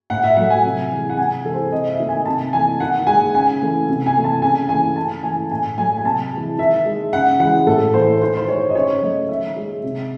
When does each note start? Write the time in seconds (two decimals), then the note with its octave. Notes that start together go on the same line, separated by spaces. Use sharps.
0.10 A2 F#5
0.24 E5
0.37 F#3 A3 F#5
0.50 G#5
0.64 C3
0.92 E3 G#3
1.09 F#5
1.17 C3 G#5
1.44 E3 G#3 A4
1.53 C5
1.72 C3 D#5
1.91 E5
2.00 D#3 A3
2.09 G#5
2.26 C3 A5
2.53 E3 A3 G#5
2.80 D#3 F#5
3.07 G#3 G#5
3.34 C#3 G#5
3.61 E3 A3
3.89 C3
4.06 G#5
4.16 E3 A3
4.24 A5
4.42 C#3 G#5
4.69 E3 A3 G#5
4.96 C#3 A5
5.23 E3 A3 G#5
5.51 A2 G#5
5.78 F#3 A3 G#5
5.97 G#5
6.05 C3 A5
6.32 E3 G#3
6.58 D#3 E5
6.85 G#3
7.13 C#3 F#5
7.39 E3 G#3 F#5
7.66 A2 A4
7.94 E3 A3 C5
8.21 D#3 C5
8.37 C5
8.48 G#3 C#5
8.69 D#5
8.75 C#3 C#5
9.02 F#3 A3 D#5
9.29 D#3 E5
9.56 G#3
9.83 C3